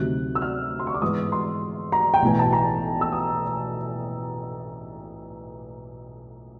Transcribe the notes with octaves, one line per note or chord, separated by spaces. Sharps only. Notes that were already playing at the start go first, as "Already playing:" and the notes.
Already playing: D2 C3 D#3 F#3 F#6
E6
F6
C6
C#6
D6
G#2 E3 G#3 B3 D#6
C6
A#5
G5
B1 A2 E3 G#5
A5
A#5
E6
D#6